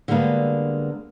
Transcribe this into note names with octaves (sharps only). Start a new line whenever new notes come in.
D3 G3 G#3 A#3 B3